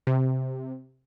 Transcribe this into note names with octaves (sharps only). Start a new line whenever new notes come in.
C3